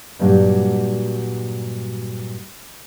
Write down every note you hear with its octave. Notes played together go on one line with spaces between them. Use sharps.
G2 A#2 F#3 G3 F#4 F#5